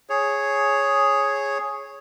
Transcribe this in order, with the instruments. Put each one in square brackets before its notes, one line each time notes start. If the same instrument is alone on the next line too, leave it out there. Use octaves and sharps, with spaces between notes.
[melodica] G#4 C#5